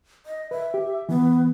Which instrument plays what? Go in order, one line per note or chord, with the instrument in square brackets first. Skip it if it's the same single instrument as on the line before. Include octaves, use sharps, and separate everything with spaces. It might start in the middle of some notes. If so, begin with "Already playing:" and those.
[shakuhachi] D#5
[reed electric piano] B4 [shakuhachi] E5
[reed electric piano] G4
[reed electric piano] E3 [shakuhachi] B3